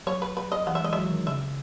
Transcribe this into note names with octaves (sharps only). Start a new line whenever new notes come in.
F#3 C#5
B4
B4
D#5
E3 F#5
E5
G#3 D#5
F#3 E5
D#3
C#3 E5